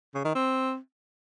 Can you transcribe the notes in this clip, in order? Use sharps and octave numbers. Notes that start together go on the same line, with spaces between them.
C#3
D#3
C4